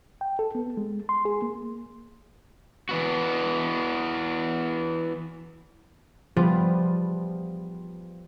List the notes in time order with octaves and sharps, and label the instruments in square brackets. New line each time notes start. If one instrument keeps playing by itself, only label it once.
[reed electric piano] G5
A4
B3
G#3
C6
G#4
A#3
[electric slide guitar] E3 B3 F#4
[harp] F3 G3 B3 F4